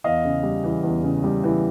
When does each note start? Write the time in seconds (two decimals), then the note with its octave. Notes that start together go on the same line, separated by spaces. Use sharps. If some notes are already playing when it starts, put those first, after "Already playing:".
0.04 E2 D#5 F5
0.25 C#3
0.43 G3
0.64 E3
0.83 E2
1.03 C#3
1.24 G3
1.44 E3